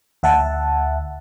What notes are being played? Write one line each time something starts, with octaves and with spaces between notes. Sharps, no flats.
D2 E5 F#5 A5